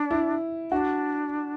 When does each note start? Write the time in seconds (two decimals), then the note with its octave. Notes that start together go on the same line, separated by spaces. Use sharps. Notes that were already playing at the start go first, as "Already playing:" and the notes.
Already playing: D4
0.11 E4
0.71 D4 F#4